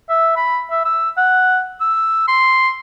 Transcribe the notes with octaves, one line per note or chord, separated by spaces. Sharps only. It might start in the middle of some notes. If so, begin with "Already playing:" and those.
E5
B5
E5
E6
F#5
E6
C6